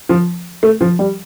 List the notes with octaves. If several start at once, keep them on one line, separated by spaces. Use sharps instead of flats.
F3
A3
F3
G3